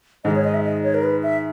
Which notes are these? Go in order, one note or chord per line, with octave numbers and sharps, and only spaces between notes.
G#2 D#3 G#3 D#5
C#5
D#5
E5
D#5
C#5
A#4
B4
E5